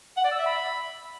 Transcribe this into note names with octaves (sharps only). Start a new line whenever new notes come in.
F#5
D5
E6
E5
B5